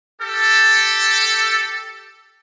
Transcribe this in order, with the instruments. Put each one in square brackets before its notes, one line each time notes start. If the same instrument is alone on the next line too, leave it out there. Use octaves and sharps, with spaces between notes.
[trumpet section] G4 A4